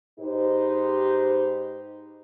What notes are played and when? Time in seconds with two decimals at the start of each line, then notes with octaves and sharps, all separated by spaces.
0.20 G#2 D#4 G4 B4 C5